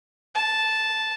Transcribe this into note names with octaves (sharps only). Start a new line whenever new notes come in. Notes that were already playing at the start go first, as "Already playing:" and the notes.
A5